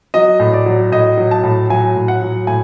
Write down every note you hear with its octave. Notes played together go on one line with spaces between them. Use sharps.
F#3 D#5
A2
D5
F#3
A2 D#5
F#3
A5
A2
F#3 G#5
A2
F#5
F#3
A2 G#5